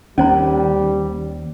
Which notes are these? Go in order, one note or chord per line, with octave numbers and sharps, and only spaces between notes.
D#2 G3 C#4 C5 A#5